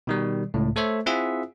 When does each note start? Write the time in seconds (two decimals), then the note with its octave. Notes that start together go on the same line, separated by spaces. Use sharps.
0.07 B2 D#3 G3
0.54 C#2 A2
0.76 A3 A4 C5 C#5 E5
1.06 C4 E4 F4 G#4 E5 F#5